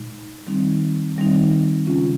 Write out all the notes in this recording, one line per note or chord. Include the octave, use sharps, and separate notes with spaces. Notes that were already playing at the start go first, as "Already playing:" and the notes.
Already playing: A#2 G#3 D#4
D#3 G3 C4 D#4
D#3 G3 C4 D#4
C#3 G#3 C#4 F4